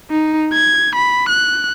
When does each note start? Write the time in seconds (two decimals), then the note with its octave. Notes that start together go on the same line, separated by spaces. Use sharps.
0.11 D#4
0.54 G#6
0.96 B5
1.30 F#6